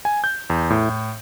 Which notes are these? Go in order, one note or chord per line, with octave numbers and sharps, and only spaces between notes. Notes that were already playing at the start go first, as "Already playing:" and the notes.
G#5
G6
E2
A2
A2